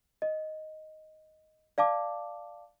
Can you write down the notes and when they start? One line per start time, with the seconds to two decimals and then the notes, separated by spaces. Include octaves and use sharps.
0.22 D#5
1.78 D5 F5 A5 D6